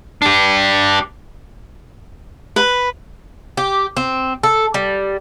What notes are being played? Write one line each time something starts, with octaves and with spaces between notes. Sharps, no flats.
D4 G4
B4
G4
C4
A4
G3